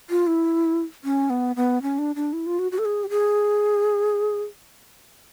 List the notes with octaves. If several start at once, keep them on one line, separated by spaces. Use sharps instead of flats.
F4
E4
C#4
B3
B3
C#4
D4
D4
E4
F4
F#4
F#4
A4
G#4
G4
G#4